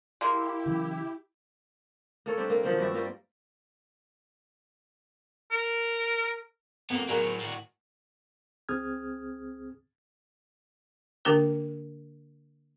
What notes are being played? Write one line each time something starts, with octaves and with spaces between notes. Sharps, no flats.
G#3 A#3 E4 G4
C#3 E3 F#3
A#3 A4 C#5
G3 C4 D4
A#3
D#3 F3 F#3 C4
G2 F#4 D5 E5
G3 A#3 F4 A#4
A#4
F2 A#3 B3
A2 F#3 G#4 A#4
A2 F#4
C#2 C4 G#4 D#6 F6 G#6
D3 A#3 D4 G4 A#4 D6